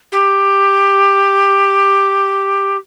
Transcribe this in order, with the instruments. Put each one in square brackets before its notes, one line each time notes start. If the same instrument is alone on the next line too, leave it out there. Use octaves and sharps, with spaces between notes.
[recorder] G4